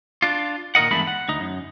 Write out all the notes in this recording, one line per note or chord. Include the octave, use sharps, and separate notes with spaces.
D4 F4
A#2 D#3 A#4 D#5 F#5
E2 G2 G#3 A3 D4 B5
F#5
D2 D#4
F#2